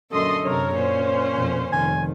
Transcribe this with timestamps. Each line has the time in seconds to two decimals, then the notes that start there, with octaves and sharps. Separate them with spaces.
0.11 F#2 A#2 D3 A4 D#5 C6
0.45 F#2 C3 A4 A#4 C#5
0.74 A#2 C#4 C5
1.36 F2 B2
1.72 F1 D#3 G#5